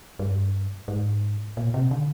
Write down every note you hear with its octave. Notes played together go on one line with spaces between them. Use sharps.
G2
G#2
A#2
C3
D3